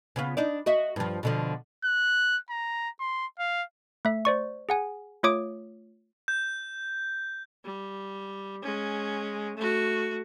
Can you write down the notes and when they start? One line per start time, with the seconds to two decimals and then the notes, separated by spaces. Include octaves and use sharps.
0.16 C#3 B3 F4
0.37 D4 D#4 D5
0.66 F#4 D#5 E5
0.96 G2 F3
1.23 B2 D3 F3
1.84 F#6
2.50 A#5
3.00 C6
3.39 F5
4.05 A3 E5
4.25 C5 D5 C#6
4.69 G#4 F#5 G#5
5.23 A3 F4 C#5 D6 D#6 D7
6.28 G6
7.65 G3
8.63 G#3 C#4
9.58 A3 F#4